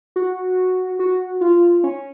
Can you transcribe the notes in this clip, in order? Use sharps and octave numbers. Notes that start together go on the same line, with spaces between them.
F#4
F#4
F4
C#4